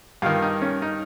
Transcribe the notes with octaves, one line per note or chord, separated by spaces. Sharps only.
G2 D#3 F4
D#4
C#4
D#4